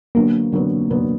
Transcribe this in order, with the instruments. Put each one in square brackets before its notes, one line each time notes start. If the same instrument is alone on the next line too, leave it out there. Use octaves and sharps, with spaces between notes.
[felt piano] D3 F#3 B3 D4 [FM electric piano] A#3
[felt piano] D3 F#3 B3 D4
D3 F#3 B3 D4